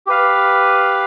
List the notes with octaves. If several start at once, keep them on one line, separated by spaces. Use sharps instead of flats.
G4 B4 F5